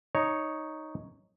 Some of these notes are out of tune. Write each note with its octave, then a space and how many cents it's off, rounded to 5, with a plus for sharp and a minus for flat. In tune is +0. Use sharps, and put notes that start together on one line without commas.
D#4 +0 C#5 +0